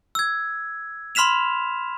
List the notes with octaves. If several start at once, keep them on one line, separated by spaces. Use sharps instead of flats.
E6 G#6
B5 C6 F6 B6 E7 F7